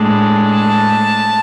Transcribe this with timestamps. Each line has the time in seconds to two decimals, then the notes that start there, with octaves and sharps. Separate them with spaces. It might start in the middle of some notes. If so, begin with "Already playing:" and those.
Already playing: A2 G#3 D4
0.50 A5